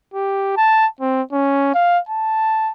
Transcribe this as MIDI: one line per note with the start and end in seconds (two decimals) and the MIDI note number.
0.14 0.56 67
0.57 0.87 81
1.01 1.22 60
1.32 1.71 61
1.74 1.99 77
2.09 2.72 81